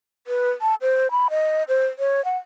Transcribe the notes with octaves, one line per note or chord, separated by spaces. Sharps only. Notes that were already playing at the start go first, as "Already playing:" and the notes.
B4
A5
C5
B5
D#5
C5
C#5
F#5